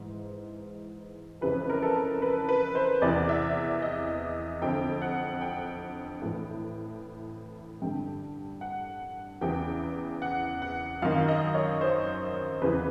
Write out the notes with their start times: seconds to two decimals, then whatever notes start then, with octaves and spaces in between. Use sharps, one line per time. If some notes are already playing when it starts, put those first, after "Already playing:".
Already playing: G#2 E3
1.41 F2 C#3 E3 B4
1.70 A#4
1.82 A4
2.22 B4
2.49 B4
2.75 C5
3.02 E2 C3 E3 D5
3.29 E5
3.82 D#5
4.62 F2 D3 G5
5.02 F#5
5.41 G5
6.22 A2 E3
7.82 G2 D3 G5
8.61 F#5
9.41 E2 C#3 E3 G5
10.22 F#5
10.62 F#5
11.02 F#2 D#3 F5
11.28 D#5
11.55 C#5
11.81 C5
12.61 E2 C#3 E3 B4